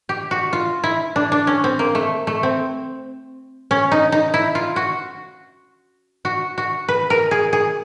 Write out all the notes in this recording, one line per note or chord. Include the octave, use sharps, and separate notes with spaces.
G4
F#4
F4
E4
D4
D4
C#4
C4
A#3
A3
A3
C4
C#4
D#4
D#4
E4
F4
F#4
F#4
F#4
B4
A#4
G#4
G#4